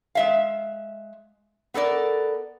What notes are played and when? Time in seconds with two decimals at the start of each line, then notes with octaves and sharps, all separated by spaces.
0.15 G#3 E5 F5
1.74 B3 A4 A#4 D5